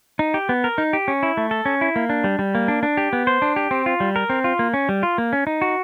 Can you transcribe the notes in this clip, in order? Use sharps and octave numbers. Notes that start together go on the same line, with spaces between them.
D#4
G4
B3
A#4
D#4
G4
C#4
E4
A3
A4
C#4
E4
A#3
D4
G3
G3
A#3
D4
D4
G4
B3
C5
D4
G4
C4
F4
G3
A#4
C4
F4
A#3
C#4
G3
F4
A#3
C#4
D#4
F#4